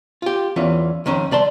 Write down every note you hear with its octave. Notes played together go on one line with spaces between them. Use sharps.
F4 G4
E2 E3 C#4 F4
F2 D#3 C#4
C2 D5 A5 C6